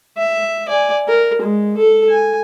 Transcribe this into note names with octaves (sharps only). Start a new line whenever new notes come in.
E5
D5 G#5
A#4
G#3
A4
G#5